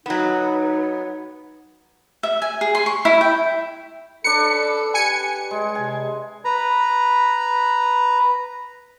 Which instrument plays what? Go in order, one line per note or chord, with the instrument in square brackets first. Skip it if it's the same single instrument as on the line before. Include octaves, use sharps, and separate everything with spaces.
[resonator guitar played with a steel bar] F#3 B3 [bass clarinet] D#4
[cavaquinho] E5
G#5
G#4
C6
C#6
E4
G5
[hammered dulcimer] D4 B4 [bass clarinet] A4 [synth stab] C#7
[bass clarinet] G4 [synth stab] G#5 C#7
[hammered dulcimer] G#3
[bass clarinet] C3 [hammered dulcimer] G#5
[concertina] B4 A#5